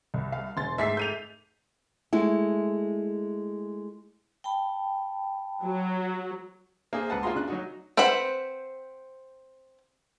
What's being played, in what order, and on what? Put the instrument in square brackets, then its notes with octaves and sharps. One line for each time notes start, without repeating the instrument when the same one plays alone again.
[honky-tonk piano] C2
[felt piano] F5
[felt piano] E1 [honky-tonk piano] C6 A6
[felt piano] G#2 A3 A4 [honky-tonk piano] E5 B6 C7
[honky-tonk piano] G6 D#7 F7
[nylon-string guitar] G#3 A3 E4
[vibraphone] G5 A5 B5
[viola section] F#3
[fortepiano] A#3 C4 G#4 C5
C#2 B4 F#5 A5
A#3 F4 F#4 G#4 A#5 C6
C#3 D4 F#6
F#3 D#4 F#4
[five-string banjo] C4 B4 C5 F#5 B5